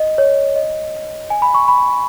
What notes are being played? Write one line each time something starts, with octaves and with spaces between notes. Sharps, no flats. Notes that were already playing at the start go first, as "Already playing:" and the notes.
Already playing: D#5
C#5
D#5
G#5
B5
C#6
B5